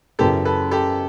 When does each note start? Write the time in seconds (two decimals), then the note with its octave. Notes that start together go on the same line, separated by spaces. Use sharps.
0.19 F#2 C#3 E3 G4 A4
0.45 A4 B4
0.71 G4 A4